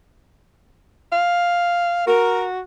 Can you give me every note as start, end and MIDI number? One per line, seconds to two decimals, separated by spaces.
1.12 2.03 77
2.07 2.60 66
2.07 2.43 70